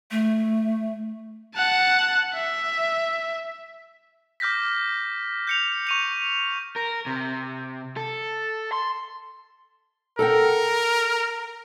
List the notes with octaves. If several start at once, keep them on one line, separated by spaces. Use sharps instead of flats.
A3
F#5 A5
E5
D6 F6 G6 A#6 B6
G6 C#7 F7
C#6 D#7 F7
A#4
C3
A4
C6
A4 A#4 F#5 G5